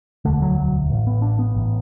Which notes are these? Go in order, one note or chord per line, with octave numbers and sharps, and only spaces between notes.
E1 D2 D3 A3
F#3
F#3
A1 A2
B3
D4
B3
A1 A2